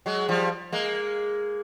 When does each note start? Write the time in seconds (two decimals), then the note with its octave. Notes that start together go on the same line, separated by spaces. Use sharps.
0.06 F#3 G#3
0.29 F3 G3
0.72 G#3 A#3